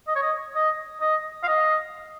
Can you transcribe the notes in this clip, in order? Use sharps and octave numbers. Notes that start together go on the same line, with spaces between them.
D#5
C#5
D#5
D#5
D#5
F5
D#5